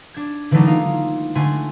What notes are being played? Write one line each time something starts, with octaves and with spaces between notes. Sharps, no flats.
D4 G#6
D3 E3 F#3 A3 D4 D#4
G#3 A#3 D#4 F4
D3 A3 F#4 G#5 C6